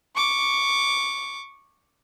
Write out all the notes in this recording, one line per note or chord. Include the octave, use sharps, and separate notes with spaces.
C#6 D6